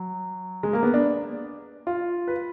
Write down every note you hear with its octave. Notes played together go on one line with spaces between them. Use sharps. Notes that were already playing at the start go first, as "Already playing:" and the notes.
Already playing: F#3
G#3
A#3
B3
D4
F4
B4